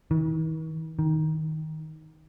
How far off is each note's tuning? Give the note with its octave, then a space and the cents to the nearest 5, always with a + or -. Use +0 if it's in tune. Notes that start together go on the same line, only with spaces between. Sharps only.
D#3 +45
D#3 +10